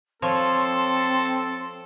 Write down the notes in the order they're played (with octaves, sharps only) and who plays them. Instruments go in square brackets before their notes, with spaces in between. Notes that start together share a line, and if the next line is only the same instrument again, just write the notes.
[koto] F3 C#5 [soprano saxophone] C4 [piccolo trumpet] A4 [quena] C6